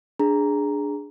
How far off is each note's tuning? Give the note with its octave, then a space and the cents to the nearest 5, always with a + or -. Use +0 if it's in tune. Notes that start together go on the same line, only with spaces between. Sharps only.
D4 +0 G#4 +0 A#5 +0